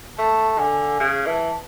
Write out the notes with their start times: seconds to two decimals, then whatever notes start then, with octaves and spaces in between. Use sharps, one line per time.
0.18 A3 A5
0.58 D3 G#5
1.00 C#3
1.26 E3 A5